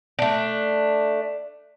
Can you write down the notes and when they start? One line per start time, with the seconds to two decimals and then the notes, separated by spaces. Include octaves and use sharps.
0.19 A3 D4